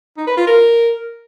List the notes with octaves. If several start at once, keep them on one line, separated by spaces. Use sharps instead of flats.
D#4
B4
F4
A#4